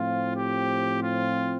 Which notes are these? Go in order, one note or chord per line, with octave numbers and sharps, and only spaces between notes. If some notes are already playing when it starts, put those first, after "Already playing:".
Already playing: A2 F3 C4 F4
G4
F4